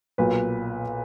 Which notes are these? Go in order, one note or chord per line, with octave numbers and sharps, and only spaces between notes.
B1 A#2 F#3 B4